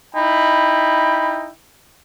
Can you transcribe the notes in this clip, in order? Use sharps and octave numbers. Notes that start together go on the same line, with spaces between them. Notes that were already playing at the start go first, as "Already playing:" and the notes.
D#4 E4 G5 B5